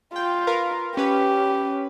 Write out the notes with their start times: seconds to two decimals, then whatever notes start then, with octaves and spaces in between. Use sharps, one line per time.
0.16 F4 G5
0.47 A#4 B4 F5
0.97 C#4 G4 B4